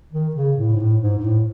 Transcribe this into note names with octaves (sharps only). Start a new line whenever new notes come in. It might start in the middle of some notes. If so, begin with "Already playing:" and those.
D#3
C#3
A2
G#2
A2
G#2
G#2
A2